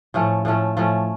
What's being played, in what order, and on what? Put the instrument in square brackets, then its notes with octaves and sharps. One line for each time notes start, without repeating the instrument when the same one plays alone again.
[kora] A2 F3 A3 C#4
A2 F3 A3 C#4
A2 F3 A3 C#4